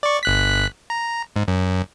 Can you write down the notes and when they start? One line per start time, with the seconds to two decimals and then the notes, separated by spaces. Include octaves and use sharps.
0.03 D5 C#6
0.23 G1 F#6 B6
0.90 A#5
1.36 G#2
1.48 F#2